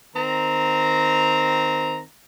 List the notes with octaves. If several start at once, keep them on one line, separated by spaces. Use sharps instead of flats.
D#3 C4 A#5